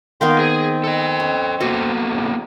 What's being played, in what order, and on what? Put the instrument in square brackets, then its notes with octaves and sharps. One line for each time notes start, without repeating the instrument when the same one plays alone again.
[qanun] D#3 A#3 B3 [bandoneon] F5 G5 C6
[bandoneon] C4 [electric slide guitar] G#4
[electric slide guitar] A4 D#5
[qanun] C#4
[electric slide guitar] A#3 B3 A4 [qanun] F#4
[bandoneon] F2 A2 C#3